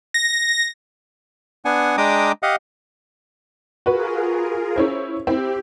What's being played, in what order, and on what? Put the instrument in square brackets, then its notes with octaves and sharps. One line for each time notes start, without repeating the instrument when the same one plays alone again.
[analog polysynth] A#6
[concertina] B3 D4 F#5 G#5
G#3 D4 G5 A#5 D6 D#6
G4 D#5 F5 F#5
[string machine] F4 G#4 A#4 [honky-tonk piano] F#4 B4
[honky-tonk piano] C#4 E4 C5
[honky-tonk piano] C4 E4 [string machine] G4